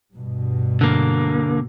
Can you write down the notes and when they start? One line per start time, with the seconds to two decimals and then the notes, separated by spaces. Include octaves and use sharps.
0.14 G2 B2
0.81 D3 A#3